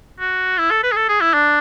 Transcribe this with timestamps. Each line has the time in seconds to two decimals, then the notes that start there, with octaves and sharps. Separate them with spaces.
0.20 F#4
0.58 E4
0.71 A4
0.83 B4
0.92 G#4
0.96 A4
1.09 G#4
1.21 E4
1.34 D4